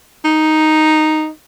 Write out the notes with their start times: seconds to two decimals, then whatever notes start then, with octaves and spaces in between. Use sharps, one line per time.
0.24 D#4